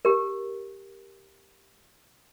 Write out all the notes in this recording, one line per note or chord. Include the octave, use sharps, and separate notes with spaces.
G4 A#4